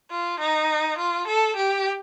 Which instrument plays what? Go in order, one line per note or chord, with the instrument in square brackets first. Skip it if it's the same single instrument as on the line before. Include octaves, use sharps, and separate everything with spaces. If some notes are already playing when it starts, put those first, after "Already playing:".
[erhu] F4
D#4
F4
A4
G4